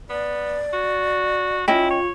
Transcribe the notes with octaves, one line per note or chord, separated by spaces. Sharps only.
B3 D5
F#4
C#4 E4 F4 D#5 G5
C#5